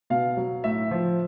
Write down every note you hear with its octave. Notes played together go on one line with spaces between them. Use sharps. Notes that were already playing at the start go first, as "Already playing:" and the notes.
B2 F5
F#3
A2 E5
F3